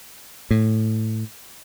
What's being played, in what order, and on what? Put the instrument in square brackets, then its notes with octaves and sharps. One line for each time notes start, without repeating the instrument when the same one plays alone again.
[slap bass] A2